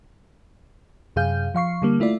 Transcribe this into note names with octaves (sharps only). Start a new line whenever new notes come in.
F#2 C3 G#4 F5 G6
F3 F5 C#6 C7
D3 G3 A#3
A3 E4 F4 D5